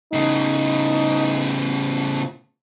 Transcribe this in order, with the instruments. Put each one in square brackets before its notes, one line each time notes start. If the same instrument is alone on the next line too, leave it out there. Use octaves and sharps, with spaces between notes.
[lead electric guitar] A2 C#3 [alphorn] D#4